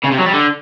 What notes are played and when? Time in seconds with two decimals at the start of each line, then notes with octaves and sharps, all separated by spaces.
0.04 C#3
0.11 C3
0.18 F#3
0.26 G3
0.33 D3